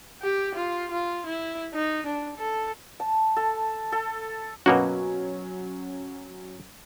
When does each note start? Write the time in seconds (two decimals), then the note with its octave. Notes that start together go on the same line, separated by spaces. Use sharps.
0.22 G4
0.55 F4
0.91 F4
1.26 E4
1.74 D#4
2.06 D4
2.37 A4
3.00 A5
3.37 A4
3.92 A4
4.66 B2 F#3 A#3 C#4 F#4